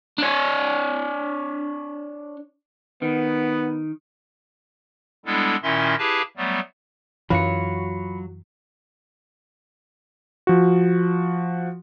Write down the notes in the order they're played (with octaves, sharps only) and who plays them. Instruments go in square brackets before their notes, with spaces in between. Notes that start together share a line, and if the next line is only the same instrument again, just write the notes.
[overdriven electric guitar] D4 C#5
[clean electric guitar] D#3 [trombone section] B3
[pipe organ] G3 G#3 B3 D4 E4 A4
A#2 D#3 C#4 E4 E5 C6
E4 G4 G#4 B4 F5 A5
F#3 G3 A3 B3
[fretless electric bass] F#2 E3 [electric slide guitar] F#3 [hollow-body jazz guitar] F4 F#4 [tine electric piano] B5 C#7
[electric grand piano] F3 F#4